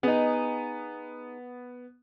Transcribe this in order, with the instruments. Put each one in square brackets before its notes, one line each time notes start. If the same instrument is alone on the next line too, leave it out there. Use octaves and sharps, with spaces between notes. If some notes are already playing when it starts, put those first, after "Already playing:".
[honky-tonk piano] B3 [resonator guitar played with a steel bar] D#4 G#4